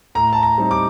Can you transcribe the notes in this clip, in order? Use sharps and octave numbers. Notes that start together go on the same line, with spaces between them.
A2 A#5
A5
A#5
G3 C4 D#4
D6